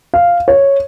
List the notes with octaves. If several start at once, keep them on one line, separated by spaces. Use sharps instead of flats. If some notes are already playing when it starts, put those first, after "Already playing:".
F5
C#5